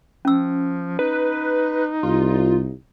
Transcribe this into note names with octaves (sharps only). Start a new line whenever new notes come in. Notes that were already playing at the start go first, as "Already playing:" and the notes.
F3 C#4 E6
D#4 B4
C2 F4